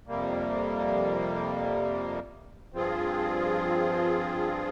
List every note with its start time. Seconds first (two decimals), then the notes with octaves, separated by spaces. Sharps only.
0.07 F2 C3 G3 A#3
2.72 G2 F3 C4 F4 G#4